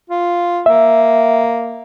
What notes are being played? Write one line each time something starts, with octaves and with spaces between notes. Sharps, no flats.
F4
A#3 E5